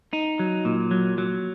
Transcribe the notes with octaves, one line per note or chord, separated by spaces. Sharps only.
D#4
F#3
A#2
F#3
F#3